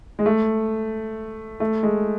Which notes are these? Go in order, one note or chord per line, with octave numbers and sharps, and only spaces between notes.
G#3
A3
A3
G#3